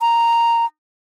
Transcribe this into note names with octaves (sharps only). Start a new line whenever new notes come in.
A#5